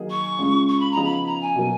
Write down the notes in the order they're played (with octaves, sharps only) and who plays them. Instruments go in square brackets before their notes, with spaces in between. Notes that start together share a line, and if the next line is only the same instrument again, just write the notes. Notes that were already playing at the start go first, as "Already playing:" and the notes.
Already playing: [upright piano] D#3 F#3 A#3 D#4 G#4
[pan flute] C#6
[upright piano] C#3 G#3 C#4 F4
[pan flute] C#6
B5
A#5
[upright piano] C#3 F3 B3 D#4 G#4
[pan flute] B5
A#5
G#5
[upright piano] B2 F#3 A#3